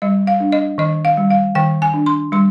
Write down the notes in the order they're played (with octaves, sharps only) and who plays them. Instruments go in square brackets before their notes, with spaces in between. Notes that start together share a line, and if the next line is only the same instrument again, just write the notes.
[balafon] G3 D#5
F5
D4
D#5
D#3 D#5
F5
G3
F5
D#3 G5
G#5
D4
C6
G3 C6